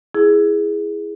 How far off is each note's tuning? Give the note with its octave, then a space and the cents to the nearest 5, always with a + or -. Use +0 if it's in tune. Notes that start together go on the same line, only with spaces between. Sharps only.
E4 +0 G#4 +0